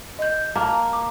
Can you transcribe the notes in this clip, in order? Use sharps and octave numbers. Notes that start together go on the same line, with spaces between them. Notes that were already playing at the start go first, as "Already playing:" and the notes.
D#5 G6
A#3 A5 A#5
D6